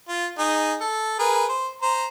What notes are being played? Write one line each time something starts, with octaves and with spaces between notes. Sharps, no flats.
F4
D#4 G#4
A4
G#4 A#4 B4
C5
C5 A#5